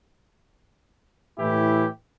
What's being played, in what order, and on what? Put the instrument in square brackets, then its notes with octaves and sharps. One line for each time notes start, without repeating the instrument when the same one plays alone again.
[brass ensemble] A2 E3 E4 G4